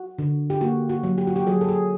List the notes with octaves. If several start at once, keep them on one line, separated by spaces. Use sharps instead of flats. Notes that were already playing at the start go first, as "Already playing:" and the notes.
Already playing: F#4
D3
G4
A#3 F#4
F#4
F#3
G4
F#4
G4
F#3 G#4
A4
G#4